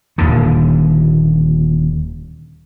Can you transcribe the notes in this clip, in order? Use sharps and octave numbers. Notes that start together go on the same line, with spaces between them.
D#1 D#2 D3